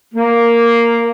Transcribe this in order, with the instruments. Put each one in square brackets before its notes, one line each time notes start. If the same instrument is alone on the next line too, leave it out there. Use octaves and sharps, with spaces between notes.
[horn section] A#3